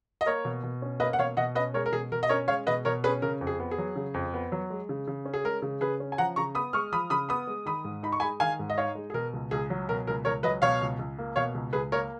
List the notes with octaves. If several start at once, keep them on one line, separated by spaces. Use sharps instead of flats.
D#5
A#3 A#4 C#5
B2
B2
C#4
A#3 B4 D#5
F#5
B2 C#5 F5
B2 D#5 F#5
C#4 B4 D#5
G#3 A#4 C#5
A#4
B2 G#4
B2 A#4
D#5
C#4 A#4 C#5
G#3 C#5 F5
B2 B4 D#5
B2 A#4 C#5
C#4 G#4 B4
C#3 A#4
F2
G#4
B3
G#4
F#3
C#3
F2
B3
F#3
G#3
C#3
C#3
C#4
G#4
G#3 A#4
C#3
C#3 G#4 B4
C#4
G#5
F3 F#5 A#5
C#3 A#5 C#6
B3 B5 D#6
G#3 C#6 F6
F3 B5 D#6
C#3 B5 D#6
B3 B5 D#6
G#3
D#3 B5 D#6
G#2
D#4 B5
C#6
G#3 G#5 B5
D#3 F5 G#5
G#2
D#5
D#4 C#5 F5
G#3
G#4
B2 A#4
C#2
C#2 G#4
F#3
B2 A#4
C#2 A#4
C#2 A#4 C#5
F#3 B4 D#5
B2 C#5 F5
C#2
C#2
A#3
B2 C#5 F5
C#2
C#2 G#4 B4
A#3 A#4 C#5